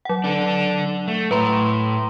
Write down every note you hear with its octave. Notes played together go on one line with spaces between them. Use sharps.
F#3 F#5
D4 A4
A3
A2 B4 A#5 C6